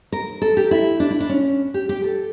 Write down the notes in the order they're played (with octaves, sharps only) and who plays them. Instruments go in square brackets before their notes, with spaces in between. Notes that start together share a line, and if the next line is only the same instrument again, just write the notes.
[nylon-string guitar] A#4
A4
G4
E4
D4
E4
D4
C#4
G4
G4
A4